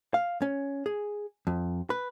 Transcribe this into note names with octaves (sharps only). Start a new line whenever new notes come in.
F5
C#4
G#4
F2
B4